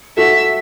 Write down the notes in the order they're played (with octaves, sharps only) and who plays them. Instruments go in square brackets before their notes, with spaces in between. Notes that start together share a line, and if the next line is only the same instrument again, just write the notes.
[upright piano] F#4 A4 [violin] E5